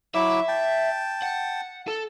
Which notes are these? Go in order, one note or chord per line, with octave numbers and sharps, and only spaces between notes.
F#3 E4 E5 D6
G5 A5
F#5
A4